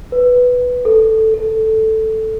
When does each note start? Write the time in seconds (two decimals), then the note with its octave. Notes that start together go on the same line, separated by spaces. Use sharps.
0.12 B4
0.85 A4
1.34 A4